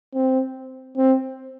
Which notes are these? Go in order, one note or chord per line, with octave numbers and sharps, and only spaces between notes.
C4
C4